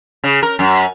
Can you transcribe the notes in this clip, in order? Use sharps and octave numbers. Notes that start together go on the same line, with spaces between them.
C#3
A#4
F#2